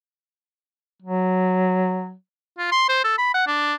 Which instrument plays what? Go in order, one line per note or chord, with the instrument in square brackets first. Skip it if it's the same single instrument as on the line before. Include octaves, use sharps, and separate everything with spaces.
[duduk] F#3
[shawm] F4
C6
C5
A4
B5
F#5
D4